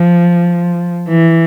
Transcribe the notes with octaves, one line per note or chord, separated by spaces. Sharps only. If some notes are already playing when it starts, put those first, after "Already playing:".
Already playing: F3
E3